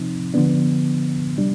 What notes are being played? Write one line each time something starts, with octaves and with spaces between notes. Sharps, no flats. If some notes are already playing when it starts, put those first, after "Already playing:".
Already playing: C3 F3 C4 D#4
D3 F3 B3 D4
C3 G3 D4